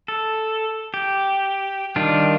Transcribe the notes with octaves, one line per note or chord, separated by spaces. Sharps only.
A4
G4
D#3 G3 D4 F4